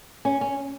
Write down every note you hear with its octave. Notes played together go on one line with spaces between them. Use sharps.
C#4
C#4